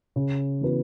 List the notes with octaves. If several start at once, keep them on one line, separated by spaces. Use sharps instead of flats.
C#3
E3 B3 F#4 B4